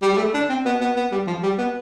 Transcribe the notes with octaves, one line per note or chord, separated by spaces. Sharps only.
G3
G3
A3
D4
C4
B3
B3
B3
G3
F3
G3
B3